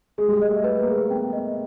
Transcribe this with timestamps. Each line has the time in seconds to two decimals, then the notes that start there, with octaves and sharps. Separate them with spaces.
0.18 G#3 G#4
0.28 G3
0.38 G#3 D#5
0.49 A3
0.64 B4
0.80 A#3
0.88 G#4
1.10 B3 G5
1.33 D#5